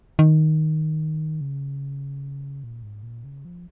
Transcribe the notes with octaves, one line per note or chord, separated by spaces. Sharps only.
D#3
C#3
A#2
G#2
A#2
C#3
F3